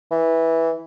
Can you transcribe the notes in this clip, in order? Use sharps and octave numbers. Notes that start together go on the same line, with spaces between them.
E3